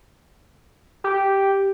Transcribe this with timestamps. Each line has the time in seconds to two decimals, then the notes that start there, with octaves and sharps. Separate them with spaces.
1.04 G4